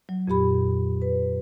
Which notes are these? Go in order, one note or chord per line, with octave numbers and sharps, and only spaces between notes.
F#3
F2 A#2 G4 B5
B4